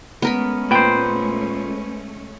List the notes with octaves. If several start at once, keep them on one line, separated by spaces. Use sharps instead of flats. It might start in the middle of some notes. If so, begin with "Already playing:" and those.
G#3 A3 B3 C#4 A#4 B5
A#2 B4 C5 G5